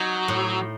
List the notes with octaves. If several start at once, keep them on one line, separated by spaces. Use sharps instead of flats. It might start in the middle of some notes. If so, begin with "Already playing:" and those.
Already playing: F#3 D#4
A2